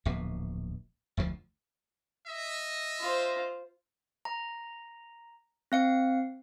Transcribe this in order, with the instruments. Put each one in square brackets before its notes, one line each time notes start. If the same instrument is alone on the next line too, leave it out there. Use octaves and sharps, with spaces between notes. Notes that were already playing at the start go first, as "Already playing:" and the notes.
[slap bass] D1 A#1 B2
F1 D2 B2 F3
[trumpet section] D#5 E5
[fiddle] F4 C5
[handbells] A#5
C4 F5 C#7